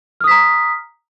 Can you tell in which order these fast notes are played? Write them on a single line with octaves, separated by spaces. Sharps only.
F6 D#6 B6 A#5